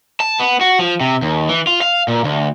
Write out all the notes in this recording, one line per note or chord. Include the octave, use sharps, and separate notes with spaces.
A5
B3
F#4
F3
C3
D#2
E3
F4
F5
A#2
D2